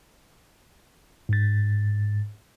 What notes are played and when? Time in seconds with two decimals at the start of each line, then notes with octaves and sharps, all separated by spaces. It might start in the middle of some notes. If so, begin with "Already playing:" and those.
1.29 G#2 A6